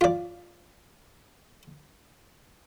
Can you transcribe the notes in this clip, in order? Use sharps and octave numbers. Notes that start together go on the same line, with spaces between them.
F4 D5